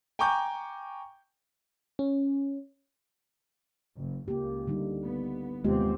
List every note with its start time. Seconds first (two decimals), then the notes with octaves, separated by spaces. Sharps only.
0.19 G5 G#5 A#5 C#6 D6 G6
1.99 C#4
3.97 F#1
4.28 C#2 A#3 G4
4.67 D3 G3 D#4
5.02 B3
5.64 D#2 C3 G#3 B3 C4 F4 G4